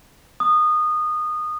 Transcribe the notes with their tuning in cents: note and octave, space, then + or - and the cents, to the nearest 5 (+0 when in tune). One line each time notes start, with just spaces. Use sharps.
D#6 -20